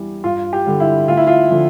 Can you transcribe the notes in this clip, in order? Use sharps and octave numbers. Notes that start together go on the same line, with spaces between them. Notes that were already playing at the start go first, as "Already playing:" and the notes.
Already playing: E2 E3 G3
G2 F4
G4
D3 G3
E4
D2 F4
E4
F4
D3 F3